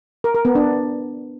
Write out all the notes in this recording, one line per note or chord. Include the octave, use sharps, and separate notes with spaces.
A#4
A#4
B3
D4